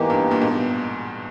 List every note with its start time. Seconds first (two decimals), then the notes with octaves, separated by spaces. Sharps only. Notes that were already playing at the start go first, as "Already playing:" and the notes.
Already playing: E2 G#2 E3 A#3 D#4 G4
0.10 G2
0.31 G2 A#2
0.41 G#2 B2